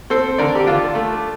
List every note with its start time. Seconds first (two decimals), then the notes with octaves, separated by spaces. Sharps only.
0.10 C4 A4 C5
0.38 D3 A#4 D5
0.55 G4
0.67 D3 D4 F4
0.95 A3